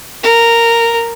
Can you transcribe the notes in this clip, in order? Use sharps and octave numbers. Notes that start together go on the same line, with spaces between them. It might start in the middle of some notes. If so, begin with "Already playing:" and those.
A#4